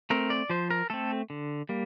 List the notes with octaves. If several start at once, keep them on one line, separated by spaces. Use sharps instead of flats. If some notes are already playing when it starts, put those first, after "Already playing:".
A3 C4 A#4
D5
F3 C5
A#4
A3 C4 A4
D3
G3 A#3